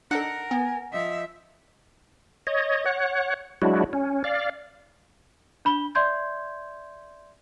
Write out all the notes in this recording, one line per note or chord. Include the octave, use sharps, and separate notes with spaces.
D4 D#4 A4 A#4 F#5
B3 G#5
F3 D#5 E5
C#5 D#5
C#5 F#5
F#3 G#3 D4 E4 F#4
C#4
D5 F5
D4 B5 G7
D5 E5 C6 G6 G#6